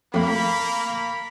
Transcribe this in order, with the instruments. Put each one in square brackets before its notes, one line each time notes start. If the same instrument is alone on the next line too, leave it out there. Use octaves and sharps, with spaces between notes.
[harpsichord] F2 A3 [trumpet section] A#3 B5